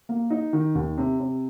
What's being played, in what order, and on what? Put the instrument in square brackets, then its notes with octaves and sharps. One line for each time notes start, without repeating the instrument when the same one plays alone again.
[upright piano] A#3
D#4
D#3
D#2
C3
C3